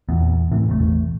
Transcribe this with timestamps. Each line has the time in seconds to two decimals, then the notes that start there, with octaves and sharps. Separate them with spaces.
0.09 E2 A#2
0.52 D#2 A2 C3 E3
0.69 E1 A1 A3